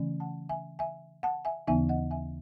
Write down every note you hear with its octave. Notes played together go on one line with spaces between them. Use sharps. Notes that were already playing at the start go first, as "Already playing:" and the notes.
Already playing: C#3 E3 A3 C#4
F#5 A5
E5 G#5
E5 G#5
F#5 A5
E5 G#5
D#2 C#3 E3 B3 D#4 E5 G#5
D#5 F#5
E5 G#5